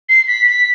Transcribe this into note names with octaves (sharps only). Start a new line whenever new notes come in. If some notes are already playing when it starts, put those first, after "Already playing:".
C7
B6
B6